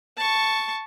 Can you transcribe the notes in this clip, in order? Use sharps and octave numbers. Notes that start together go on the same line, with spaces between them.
A5 C#6